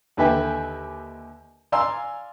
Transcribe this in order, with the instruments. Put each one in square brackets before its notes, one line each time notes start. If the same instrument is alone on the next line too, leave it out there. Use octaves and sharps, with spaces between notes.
[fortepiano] D#2 D3 B4 E5 G5 G#5
D5 F5 G#5 A#5 C6 E6